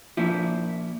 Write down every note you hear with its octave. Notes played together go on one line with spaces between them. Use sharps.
A#2 F3 E4